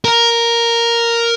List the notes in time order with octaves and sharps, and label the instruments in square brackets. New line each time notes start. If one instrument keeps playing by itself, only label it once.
[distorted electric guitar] A#4